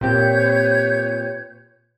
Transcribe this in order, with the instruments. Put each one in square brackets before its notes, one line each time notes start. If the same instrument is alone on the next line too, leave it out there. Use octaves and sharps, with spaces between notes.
[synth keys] A#2 C4 G4 [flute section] B4 C#5 G6